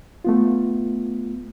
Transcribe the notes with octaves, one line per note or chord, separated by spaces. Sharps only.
A3 B3 F4